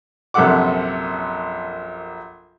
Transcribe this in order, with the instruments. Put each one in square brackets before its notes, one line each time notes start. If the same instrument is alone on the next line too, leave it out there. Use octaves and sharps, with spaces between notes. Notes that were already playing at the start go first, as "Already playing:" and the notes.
[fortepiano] A#1 F#2 C3 A4 F#5 D6